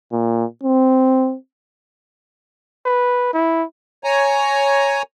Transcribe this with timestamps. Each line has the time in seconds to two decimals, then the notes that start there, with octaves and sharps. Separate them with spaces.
0.12 A#2
0.63 C4
2.86 B4
3.33 E4
4.04 C#5 G#5 A#5